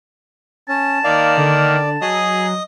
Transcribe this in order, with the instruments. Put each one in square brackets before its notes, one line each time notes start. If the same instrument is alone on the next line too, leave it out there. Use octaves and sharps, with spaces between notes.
[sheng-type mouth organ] C#4 [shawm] A5
[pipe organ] D#3 A#3 [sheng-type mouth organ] D5 [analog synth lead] F5
[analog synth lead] D3
[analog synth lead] F#3 [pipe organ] G#4 [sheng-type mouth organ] D#5 D#6